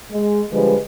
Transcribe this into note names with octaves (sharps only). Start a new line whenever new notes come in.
G#3
D3 F3 G3 G#3 B4